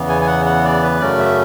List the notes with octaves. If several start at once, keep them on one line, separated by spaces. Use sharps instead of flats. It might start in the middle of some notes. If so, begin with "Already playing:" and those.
Already playing: E2 C#3 E3 B3
G#5
G#5
F#5
F#5
D5
B4
F#2 C#3 F#3 A3 C#4 D5
E5